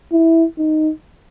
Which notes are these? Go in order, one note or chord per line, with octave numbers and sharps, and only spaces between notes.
E4
D#4